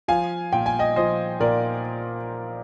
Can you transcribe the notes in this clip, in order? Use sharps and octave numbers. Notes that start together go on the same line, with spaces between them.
F3 F5 G#5
A#2 G5
G#5
D#5 G5
F3 C5 D#5
A#2 A#4 D5